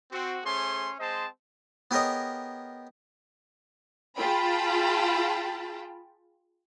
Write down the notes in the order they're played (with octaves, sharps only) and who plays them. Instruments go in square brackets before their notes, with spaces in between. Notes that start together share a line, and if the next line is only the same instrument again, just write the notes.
[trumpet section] C4 F#4
A3 C#4 G#4 C5 C6
G#3 C4 C5 D#5 A5
[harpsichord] B3 G4 G#4 A#4 C#5 D#5
[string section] F4 G#4 G5 A5 B5